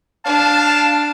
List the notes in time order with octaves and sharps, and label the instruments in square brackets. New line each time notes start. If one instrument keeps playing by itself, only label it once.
[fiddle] D4 [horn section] F5 A5